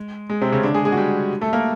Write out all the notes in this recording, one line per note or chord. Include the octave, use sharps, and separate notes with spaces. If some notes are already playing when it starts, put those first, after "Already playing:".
Already playing: G#3
G#3
C3 C4
C#3 C#4
D3 D4
G#3 G#4
G#3 G#4
F#4
G3 G4
A3 A4
A#3 A#4